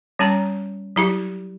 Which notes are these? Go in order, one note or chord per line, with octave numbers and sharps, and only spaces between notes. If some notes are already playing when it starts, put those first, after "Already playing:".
G3 C#4 A5 A#5
F#3 E4 G4